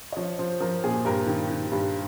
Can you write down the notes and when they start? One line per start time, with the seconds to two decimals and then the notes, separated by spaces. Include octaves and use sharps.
0.12 D#5
0.16 F3 C#5
0.39 F3 C5
0.60 F3 A#4
0.84 A#2 G#4
1.05 G2 A#4
1.27 D#3
1.50 D#3
1.72 G2